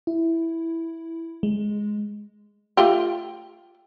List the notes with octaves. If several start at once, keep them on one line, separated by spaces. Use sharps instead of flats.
E4
G#3
A3 F4 G4